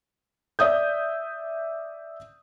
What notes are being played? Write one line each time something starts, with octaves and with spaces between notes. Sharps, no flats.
D5 E5 D#6 G6